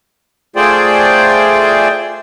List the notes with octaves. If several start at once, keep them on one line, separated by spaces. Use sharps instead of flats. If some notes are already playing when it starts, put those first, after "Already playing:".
A3 F4 G#4 C5 D5 G5